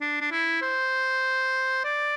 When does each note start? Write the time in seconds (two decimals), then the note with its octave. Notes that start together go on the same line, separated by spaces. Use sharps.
0.01 D4
0.21 D4
0.31 E4
0.62 C5
1.84 D5